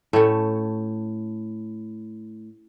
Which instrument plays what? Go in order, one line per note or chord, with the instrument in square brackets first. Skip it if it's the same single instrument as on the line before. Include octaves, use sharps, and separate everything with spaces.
[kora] A2 [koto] A3 C#4